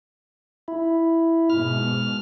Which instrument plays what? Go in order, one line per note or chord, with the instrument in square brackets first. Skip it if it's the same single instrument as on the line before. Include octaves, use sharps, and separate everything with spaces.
[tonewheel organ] E4
[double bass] G#2 B2 [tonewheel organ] F6